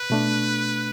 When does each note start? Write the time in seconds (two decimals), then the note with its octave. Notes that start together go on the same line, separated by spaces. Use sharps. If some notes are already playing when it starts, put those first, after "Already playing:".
Already playing: B4
0.10 B2 A3 D4